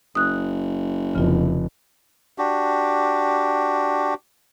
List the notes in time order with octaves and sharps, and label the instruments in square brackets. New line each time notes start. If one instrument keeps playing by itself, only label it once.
[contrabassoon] F#1 [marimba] D#6 F#6
[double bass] F1 [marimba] C#3 F4
[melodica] D4 F#4 G4